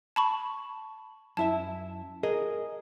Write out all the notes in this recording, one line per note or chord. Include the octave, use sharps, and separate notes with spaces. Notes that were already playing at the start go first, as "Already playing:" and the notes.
A5 B5 C#6
F#2 E4 E5 A5
G#4 A#4 D#5